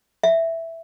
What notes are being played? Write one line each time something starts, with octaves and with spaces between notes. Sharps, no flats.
E5